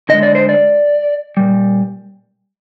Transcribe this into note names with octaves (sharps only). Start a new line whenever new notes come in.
D3 G#3 D#5
D5
C5
D5
A#2 G3